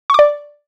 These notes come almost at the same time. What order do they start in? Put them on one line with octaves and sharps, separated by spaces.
C#6 D6 D5